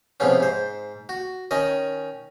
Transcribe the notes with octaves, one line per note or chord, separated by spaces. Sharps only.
G#2 C3 F3 B3 C#4
G#2 C5
F#4
D#3 C#4 D#5